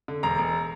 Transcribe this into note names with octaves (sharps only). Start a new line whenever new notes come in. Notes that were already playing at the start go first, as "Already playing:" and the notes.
D3
E1 A#5
E1